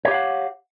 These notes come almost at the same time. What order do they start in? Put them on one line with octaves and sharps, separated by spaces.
C#5 G4 F5 F#5